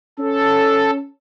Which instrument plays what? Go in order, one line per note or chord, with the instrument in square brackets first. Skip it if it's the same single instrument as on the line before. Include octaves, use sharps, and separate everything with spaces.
[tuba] C#4 [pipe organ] A4